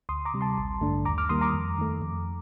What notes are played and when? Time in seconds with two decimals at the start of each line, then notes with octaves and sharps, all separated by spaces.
0.09 D2 C6 D#6
0.25 A#5 D6
0.34 C3 G3
0.41 A5 C6
0.58 A1
0.81 G2 D3 A3 D4
1.05 D#2 A#5 D6
1.18 D6 F6
1.29 D#3 G3 A#3 C6 D#6
1.41 A#5 D6
1.54 F2
1.78 D#3 A3
2.02 F2